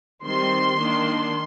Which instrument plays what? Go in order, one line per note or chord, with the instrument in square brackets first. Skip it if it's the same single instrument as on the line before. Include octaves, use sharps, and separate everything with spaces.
[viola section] D#3 G3 C4 C6
D#3 A#3 D4